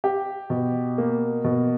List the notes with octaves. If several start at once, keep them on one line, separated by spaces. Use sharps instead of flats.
G4
B2
A#3
B2